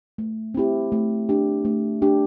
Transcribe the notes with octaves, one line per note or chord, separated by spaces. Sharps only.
A3
C4 E4 G4
A3
D4 G4
A3
D4 G4